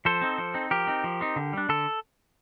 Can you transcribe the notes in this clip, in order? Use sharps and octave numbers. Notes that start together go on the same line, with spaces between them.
F3 A4 C5
C4 D#4
F3
C4 D#4
F3 G4 A#4
C4 D#4
F3
C4 D#4
D3
G3 D4
D3 A4